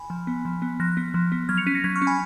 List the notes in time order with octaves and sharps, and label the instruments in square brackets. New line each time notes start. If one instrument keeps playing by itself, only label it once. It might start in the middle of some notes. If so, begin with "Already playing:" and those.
Already playing: [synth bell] G#5 B5
F3
B3
F3
B3
F3 F#6 A#6
B3
F3
B3
F#3 F6 G#6
C#7 F7
C#4 B6 D#7
A#6 C#7
F#3 G#6 B6
C#6 F6
C#4
G#5 B5